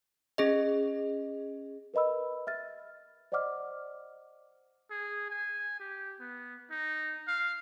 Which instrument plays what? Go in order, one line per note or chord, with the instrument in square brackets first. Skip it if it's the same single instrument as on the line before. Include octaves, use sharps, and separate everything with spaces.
[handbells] C#4 G#4 D#5
[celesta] A#4 B4 D#5 B5 E6
E5 F6 A6
C5 D5 D#5 F#5 D6 F6
[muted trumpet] G#4
G#5
G4
B3
D#4
F5